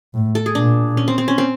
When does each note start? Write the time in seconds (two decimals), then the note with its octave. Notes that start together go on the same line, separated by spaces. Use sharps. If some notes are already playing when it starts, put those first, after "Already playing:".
0.14 A2
0.35 A4
0.46 G#4
0.55 A#2 D4
0.97 C#4
1.08 C4
1.18 C4
1.28 C#4
1.38 C4